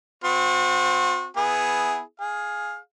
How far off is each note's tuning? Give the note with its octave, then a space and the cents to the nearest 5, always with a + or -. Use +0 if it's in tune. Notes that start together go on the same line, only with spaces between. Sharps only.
C4 -15 F#4 -40
B3 +0 E4 -5 G#4 +0
G#4 +0 F5 +15